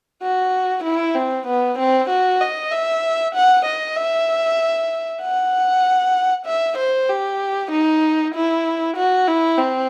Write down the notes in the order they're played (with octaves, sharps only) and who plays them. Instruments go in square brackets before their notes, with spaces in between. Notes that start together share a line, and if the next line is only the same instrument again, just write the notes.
[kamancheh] F#4
E4
C4
B3
C4
F#4
D#5
E5
F#5
D#5
E5
F#5
E5
C5
G4
D#4
E4
F#4
E4
C4